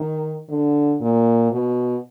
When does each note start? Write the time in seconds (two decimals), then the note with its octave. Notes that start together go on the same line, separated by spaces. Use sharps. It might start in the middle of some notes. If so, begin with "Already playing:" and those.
Already playing: D#3
0.49 D3
1.01 A#2
1.51 B2